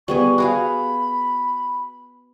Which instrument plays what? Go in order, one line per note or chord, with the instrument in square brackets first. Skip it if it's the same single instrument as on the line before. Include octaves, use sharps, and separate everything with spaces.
[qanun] G3 B3 G#4 [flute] C#6
[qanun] F#4 G#4 F5 [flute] B5